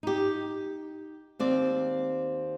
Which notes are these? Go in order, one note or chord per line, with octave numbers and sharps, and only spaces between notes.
D#4 G4
D#2 C4 D5